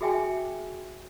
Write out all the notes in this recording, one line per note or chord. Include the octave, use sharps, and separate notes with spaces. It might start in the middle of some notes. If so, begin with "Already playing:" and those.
F#4 G#4 E5 G5 G#5